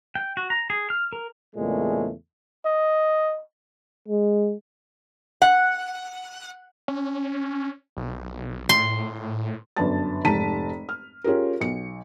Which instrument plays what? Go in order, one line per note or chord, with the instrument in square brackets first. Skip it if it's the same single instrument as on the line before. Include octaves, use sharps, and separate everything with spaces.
[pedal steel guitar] G5
F#4
A#5
G#4
F6
A#4
[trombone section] E2 A#2 C#3 G#3 A3
[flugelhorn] D#5
[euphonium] G#3
[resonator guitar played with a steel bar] F#5
[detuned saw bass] C#4
B1
[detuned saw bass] A2 [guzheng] C6
[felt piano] G1 F#2 D4 B4 A5 A6
F1 G#2 A5 A#5 B6 D#7
F6
C#4 F4 G4 G#4 A#4
B1 C#7